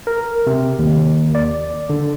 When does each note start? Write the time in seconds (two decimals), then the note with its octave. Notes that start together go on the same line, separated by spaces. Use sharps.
0.07 A#4
0.47 C3
0.79 D#2
1.35 D5
1.89 D3